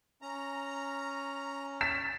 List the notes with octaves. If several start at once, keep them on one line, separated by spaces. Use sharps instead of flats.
C#4 A#5
A6 B6 E7